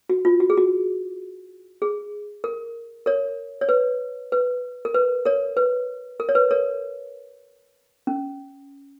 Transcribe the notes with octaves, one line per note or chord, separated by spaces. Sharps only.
F#4
F4
F#4
G#4
F#4
G#4
A#4
A#4 C#5
C#5
B4
B4
A#4
B4
A#4 C#5
B4
A#4
C#5
B4
A#4 C#5
C#4